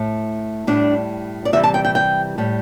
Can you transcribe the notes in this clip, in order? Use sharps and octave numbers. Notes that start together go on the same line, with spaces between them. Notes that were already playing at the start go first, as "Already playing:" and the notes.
Already playing: A2 A3
A2 G3 D4
D5
C3 E3 G3 E5
A5
G5
G5
G5
A2 G3